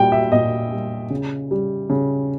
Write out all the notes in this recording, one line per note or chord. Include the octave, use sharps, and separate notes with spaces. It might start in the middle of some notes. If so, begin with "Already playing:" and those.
Already playing: A#2 G3 G5
E5
A#2 D#5
G3
C#3
G3
C#3